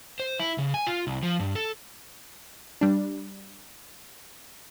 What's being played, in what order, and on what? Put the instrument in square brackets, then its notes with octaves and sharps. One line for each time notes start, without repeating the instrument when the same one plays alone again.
[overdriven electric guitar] C5
E4
C#3
G#5
F4
C2
F3
G2
A4
[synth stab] G3 D4